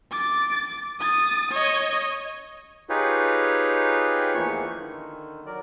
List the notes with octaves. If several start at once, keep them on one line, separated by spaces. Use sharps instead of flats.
D6 A6
D#6 A6
C#5 D#5
D#4 F4 G4 G#4 B4 C#5
E2 E3 F3 A3 A#3 C#6
D3 D#3
F#3 A#4 D5